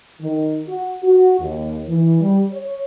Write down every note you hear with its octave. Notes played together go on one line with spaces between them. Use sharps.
D#3
F#4
F#4
D#2
E3
G3
C#5